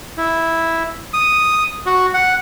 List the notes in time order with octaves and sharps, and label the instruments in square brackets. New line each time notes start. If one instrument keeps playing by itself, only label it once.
[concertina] E4
D#6
F#4
F#5